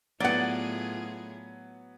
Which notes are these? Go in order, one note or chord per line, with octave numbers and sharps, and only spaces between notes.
A2 F#3 B3 F4 G#4 D5 F#5